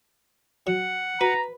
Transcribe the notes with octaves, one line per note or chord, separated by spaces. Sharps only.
F#3 F#5
F#4 B4 A#5